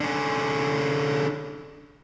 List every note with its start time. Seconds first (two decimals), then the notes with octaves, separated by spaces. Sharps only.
0.01 D3 C#4